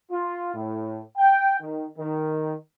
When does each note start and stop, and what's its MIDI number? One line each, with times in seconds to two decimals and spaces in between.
0.11 0.53 65
0.54 1.00 45
1.18 1.57 79
1.60 1.86 51
1.98 2.54 51